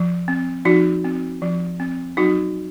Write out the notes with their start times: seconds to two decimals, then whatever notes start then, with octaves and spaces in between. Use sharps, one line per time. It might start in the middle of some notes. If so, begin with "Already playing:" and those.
Already playing: F3
0.28 C4
0.65 F3 D#4 F#4
1.04 C4
1.42 F3
1.80 C4
2.17 F#3 D#4 F#4